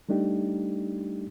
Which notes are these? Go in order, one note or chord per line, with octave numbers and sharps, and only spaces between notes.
G3 A3 D4 D#4 G4